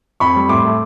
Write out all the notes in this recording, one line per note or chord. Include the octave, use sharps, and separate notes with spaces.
F2 B5 C#6
G3
A2 C6 D6
A3